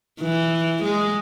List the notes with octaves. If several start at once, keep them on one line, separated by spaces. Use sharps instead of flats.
E3
G#3